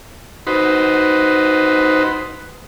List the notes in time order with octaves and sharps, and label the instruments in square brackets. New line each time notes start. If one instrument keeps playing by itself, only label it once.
[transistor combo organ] D#4 F#4 B4 C5